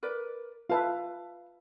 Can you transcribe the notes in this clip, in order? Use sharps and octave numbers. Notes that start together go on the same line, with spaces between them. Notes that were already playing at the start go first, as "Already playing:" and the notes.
A#4 B4 D5
F4 B4 E5 F5 A5